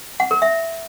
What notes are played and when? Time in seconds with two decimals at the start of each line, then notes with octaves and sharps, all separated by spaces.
0.20 F#5
0.31 A#4
0.42 E5